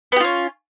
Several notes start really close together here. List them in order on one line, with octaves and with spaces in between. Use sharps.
B3 G4 F4 C#4